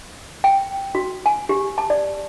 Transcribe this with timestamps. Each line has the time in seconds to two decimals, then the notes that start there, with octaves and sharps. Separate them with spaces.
0.44 G5
0.95 F#4
1.26 G#5
1.49 G4
1.78 A5
1.90 D5